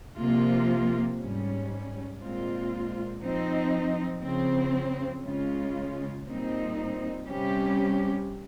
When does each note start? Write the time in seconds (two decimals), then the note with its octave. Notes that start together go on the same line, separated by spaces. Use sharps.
0.17 C3 F3 A#3 F4
1.19 G#2 G3 C#4
2.21 A#2 G#3 C4 F4
3.21 F3 C4 D#4
4.23 C#3 F3 C4
5.24 C#3 G#3 C#4 F4
6.26 A#2 G3 C4 D#4
7.27 C3 G3 C#4 G4